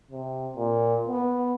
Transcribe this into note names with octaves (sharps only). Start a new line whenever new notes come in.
C3
A#2
B3